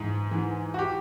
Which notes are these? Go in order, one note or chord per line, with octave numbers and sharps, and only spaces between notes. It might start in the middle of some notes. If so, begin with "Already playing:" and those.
Already playing: G#2 E3
E3
F#4
G4